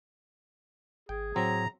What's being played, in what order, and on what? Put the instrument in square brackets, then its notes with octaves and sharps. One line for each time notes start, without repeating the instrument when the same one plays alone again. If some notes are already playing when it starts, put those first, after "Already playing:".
[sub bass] G#1 [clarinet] G#4 [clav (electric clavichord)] G5
[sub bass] A2 [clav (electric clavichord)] F#3 C4 [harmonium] A#5